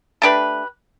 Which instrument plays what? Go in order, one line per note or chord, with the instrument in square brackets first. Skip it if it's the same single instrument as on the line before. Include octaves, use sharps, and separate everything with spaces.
[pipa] A3 D4 G4 B4